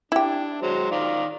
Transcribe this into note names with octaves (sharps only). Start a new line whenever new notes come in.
D4 E4 G4
F#3 G#3 C5
D#3 F4 D5